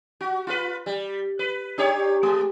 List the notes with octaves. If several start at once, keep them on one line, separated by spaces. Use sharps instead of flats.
F#4
F4 F#4 B4
G3
B4
D4 G4 C#5
G#3